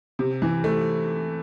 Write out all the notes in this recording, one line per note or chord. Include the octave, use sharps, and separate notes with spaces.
C3
E3
A3